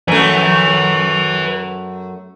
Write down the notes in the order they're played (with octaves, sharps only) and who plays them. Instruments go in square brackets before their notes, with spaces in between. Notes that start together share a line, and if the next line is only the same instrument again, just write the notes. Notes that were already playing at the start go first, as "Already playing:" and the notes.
[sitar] F#2 A3 [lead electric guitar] B4 G#5